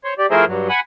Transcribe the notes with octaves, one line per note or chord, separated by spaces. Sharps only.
C5 C#5
G4 D5
F3 A3 E4 G#4 A#4 C5
G2 F#3
F#5 G#5 B5